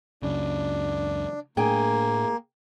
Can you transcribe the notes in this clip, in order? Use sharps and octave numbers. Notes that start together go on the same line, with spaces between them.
C#2 F#2 C#3 D4
A2 A3 A#3 D4 G#4 G5